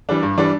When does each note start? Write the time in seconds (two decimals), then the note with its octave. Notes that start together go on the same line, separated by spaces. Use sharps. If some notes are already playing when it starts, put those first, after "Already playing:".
0.09 E3 G3 D4
0.23 G2
0.37 E3 G3 D4